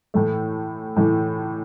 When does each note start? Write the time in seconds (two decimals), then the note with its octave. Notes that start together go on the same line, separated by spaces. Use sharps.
0.14 A2 E3 A3
0.96 A2 E3 A3